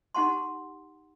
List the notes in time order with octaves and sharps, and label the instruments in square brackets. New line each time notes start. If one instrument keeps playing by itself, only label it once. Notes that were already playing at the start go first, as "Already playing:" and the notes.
[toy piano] D#4 G4 F#5 A5 C6